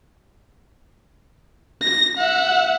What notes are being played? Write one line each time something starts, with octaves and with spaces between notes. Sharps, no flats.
A#6
E5 F#5